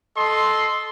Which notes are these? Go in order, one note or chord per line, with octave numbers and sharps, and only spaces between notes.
A4 D#5 C6